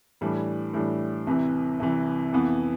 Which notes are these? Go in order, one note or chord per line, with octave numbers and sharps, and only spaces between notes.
A2 E3 G3 D4
A2 E3 G3 D4
C2 C3 E3
C2 C3 E3
F2 E3 B3